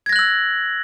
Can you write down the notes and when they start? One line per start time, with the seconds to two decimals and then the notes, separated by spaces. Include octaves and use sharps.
0.06 G#6
0.09 A#6
0.13 F#6
0.16 F#7
0.19 E6